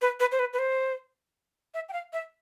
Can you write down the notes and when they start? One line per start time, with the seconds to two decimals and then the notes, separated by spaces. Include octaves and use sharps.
0.02 B4
0.20 B4
0.32 C5
0.39 B4
0.53 B4
0.59 C5
1.74 E5
1.89 G5
1.93 F5
2.13 E5